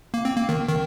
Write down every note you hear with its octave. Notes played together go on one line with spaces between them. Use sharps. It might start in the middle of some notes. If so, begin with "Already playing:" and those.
A#3
C4
A#3
D#3
D#3